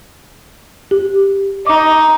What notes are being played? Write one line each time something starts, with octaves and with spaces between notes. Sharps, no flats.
G4
D#4 D6